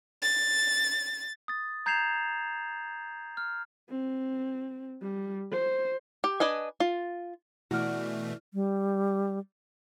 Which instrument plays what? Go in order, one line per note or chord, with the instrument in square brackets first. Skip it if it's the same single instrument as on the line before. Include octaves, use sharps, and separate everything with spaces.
[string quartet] A6
[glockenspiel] D#6 A6
A#5 G6 G#6 C7 E7 F7
F6
[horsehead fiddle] C4
G3
C5
[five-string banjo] G4
D4 B4 D#5 G#5
F4
[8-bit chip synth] B2 E3 A3 [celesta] E4 F6 [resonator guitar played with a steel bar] F#4 D5
[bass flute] G3